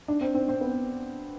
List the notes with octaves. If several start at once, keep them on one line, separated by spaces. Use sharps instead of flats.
D4
C4
C4
C4
B3